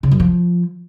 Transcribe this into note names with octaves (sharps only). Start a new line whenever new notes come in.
C#3
F#2
F3